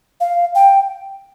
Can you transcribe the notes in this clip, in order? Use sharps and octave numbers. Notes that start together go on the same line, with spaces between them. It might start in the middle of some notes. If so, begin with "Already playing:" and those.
F5
G5